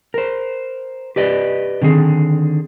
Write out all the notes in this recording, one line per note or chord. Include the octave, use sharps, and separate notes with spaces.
A#4 C5
G4 B4 D5 D#5
D3 D#3 C4 G#4